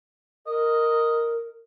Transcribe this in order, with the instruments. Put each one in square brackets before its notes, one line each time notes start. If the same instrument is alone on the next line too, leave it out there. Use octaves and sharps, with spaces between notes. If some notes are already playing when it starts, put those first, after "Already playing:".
[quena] A#4 [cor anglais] D#5